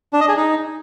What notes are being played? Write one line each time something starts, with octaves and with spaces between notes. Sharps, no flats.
D4
D#5
G#4
D#4